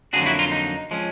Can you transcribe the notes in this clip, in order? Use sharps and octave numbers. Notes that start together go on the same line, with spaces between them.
F2 D3 F#3 A#3 D4 F#4 G#4
E4 F#4
D#4 F4
D#4
F3 G#3 C#4